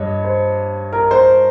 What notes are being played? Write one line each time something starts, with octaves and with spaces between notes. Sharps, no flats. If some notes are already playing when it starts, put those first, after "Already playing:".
Already playing: G2 C#5 D#5
C5
A#4
C5